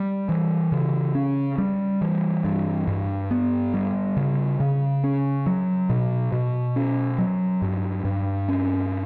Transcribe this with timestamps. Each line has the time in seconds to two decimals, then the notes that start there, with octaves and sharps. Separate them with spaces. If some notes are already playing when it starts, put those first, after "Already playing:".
Already playing: G3
0.29 E3
0.72 C#3
1.15 C#4
1.58 G3
2.01 E3
2.44 G2
2.87 G2
3.31 B3
3.74 G3
4.17 C#3
4.60 C#3
5.04 C#4
5.46 F#3
5.90 B2
6.32 B2
6.76 C#4
7.18 F#3
7.62 G2
8.05 G2
8.48 C#4